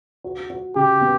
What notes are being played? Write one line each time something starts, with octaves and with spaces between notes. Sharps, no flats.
F#4
F#4
C#3 G4
B3